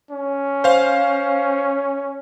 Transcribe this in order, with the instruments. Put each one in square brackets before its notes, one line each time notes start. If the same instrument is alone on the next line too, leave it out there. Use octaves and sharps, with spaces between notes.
[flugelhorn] C#4
[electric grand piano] C5 F5